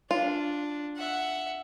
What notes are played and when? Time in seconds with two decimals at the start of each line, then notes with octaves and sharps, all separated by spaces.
0.11 D4 F4
0.97 E5 F#5